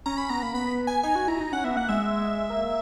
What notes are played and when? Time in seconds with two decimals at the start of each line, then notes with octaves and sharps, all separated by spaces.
0.06 C#4 A#5
0.17 C#4 B5
0.30 B3 A#5
0.43 A#3 B5
0.54 B3 B5
0.87 G#5
1.03 D#4 G#5
1.15 F#4
1.28 E4 A#5
1.40 D#4
1.52 C#4 F#5
1.64 B3 E5
1.77 A#3 F#5
1.89 G#3 E5
2.50 A#3